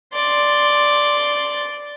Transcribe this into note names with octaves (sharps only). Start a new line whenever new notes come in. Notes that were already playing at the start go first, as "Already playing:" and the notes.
D5 C6